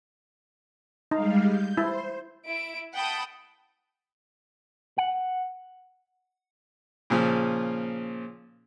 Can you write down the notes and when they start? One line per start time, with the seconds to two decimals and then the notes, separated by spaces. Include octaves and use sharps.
1.11 G3 G#3 D#4 F5
1.46 G6
1.77 E4 C5
2.47 E4 D7
2.94 F#5 G5 A5 B5 D#6
4.98 F#5
7.10 A#2 C#3 F3